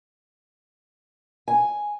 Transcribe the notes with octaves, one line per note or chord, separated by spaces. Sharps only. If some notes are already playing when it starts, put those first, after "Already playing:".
G#5